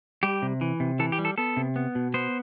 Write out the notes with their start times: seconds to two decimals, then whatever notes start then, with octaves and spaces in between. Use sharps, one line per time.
0.23 G3 G4
0.42 C3
0.61 E3
0.80 C3
0.99 E3 A4
1.12 G4
1.19 G3
1.25 A4
1.38 B3 A4
1.57 C3
1.76 B3
1.95 B2
2.14 B3 C5